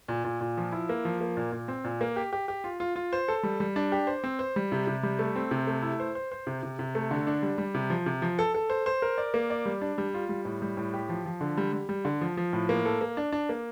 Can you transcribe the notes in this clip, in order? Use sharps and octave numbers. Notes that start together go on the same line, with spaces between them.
A#2
A#2
A#2
F3
E4
A#3
F3
A#3
A#2
A#2
C4
A#2
A#3
G4
G4
G4
F4
F4
F4
C5
A4
G3
G3
D4
G4
C5
C4
C5
G3
C3
C3
G3
A3
C4
C3
A3
E4
C5
C5
C5
C3
C3
C3
A3
D3
D4
G3
G3
C3
F3
C3
F3
A4
A4
C5
C5
A#4
D5
A#3
D5
G3
D4
G3
F4
G3
A2
G3
A2
G4
F3
F3
D3
G3
G3
G3
D3
F3
F3
A2
A#3
A4
A#3
D4
D4
A#3